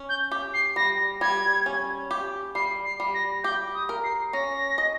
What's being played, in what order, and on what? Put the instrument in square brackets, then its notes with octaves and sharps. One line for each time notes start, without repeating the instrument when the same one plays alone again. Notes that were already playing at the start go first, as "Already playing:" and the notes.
Already playing: [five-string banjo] C#4
[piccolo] G6
[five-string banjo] G4
[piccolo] C7
[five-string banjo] G3 [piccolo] A#6
[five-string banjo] G3 [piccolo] G#6
[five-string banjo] C#4
G4
[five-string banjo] G3 [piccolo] C7
[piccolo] C7
[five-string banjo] G3
[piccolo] A#6
[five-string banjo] G4 [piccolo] G6
[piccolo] D#6
[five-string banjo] A#4
[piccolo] C7
[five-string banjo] C#4 [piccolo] A#6
[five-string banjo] D#5